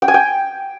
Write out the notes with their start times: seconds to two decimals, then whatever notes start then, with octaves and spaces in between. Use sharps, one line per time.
0.02 G5
0.08 G#5
0.14 G5